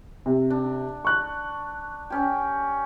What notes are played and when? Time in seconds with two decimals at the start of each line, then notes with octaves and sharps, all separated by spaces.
0.26 C3
0.50 D4
1.05 C#6 F#6
2.10 C#4 G4